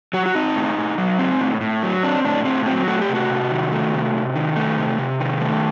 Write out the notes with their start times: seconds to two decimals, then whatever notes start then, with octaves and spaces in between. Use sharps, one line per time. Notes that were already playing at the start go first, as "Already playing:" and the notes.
0.13 F#3 F#4
0.26 F#4
0.35 C4 D#4
0.56 A2
0.77 A2
0.98 F#3
1.19 C4
1.40 A2
1.61 A2
1.83 F#3
2.03 C4 D4
2.25 A2 D4
2.45 A2 C4
2.66 F#3 C4
2.88 A3 F#4
3.01 G4
3.09 C3
3.15 F#4
3.30 C3
3.51 D#3
3.72 A3
3.93 C3
4.14 C3
4.36 D#3
4.56 A3
4.78 C3
4.98 C3
5.20 D#3
5.41 A3